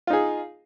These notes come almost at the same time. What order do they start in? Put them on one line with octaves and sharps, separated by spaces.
F4 D#4 G#4